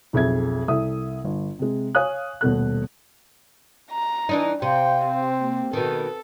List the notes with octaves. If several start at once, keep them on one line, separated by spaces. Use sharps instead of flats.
B1 F2 G#4 E5 G#6
C2 A4 E5 D#6
G1
C3 G#3
C#5 F5 G#5 D#6 F#6
D#1 B2 A3 F#6
A#5
E3 D4 D#4
C3 F5 G5
C4
A#3
B2 D#3 A4 B4